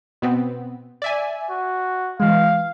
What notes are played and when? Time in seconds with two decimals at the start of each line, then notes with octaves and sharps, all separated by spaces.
0.22 B2 B3 C4
1.02 D5 E5 G#5
1.51 F#4
2.20 E3 G#3 F5